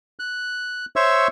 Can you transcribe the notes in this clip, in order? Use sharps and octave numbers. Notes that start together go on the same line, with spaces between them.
F#6
C5 C#5 E5 C#6 E6